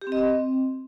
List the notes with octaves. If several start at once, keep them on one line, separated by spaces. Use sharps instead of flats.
G4
C4
D#5
C4